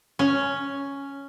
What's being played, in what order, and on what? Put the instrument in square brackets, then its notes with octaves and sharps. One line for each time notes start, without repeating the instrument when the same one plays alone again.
[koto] C#4